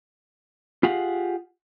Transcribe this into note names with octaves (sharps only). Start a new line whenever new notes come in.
F4 G4 G#4 F5 F#5